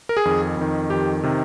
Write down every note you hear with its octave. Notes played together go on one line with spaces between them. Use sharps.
A#4
G#4
F2 D#3
F2 D#3
F2 D#3 G4
C3 D#3